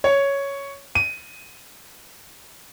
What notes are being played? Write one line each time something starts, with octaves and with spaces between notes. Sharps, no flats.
C#5
D#7